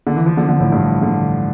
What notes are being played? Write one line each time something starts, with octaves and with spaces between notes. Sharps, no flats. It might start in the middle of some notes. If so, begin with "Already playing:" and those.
D3
E3
F3
D3
D3
A2
G2
D3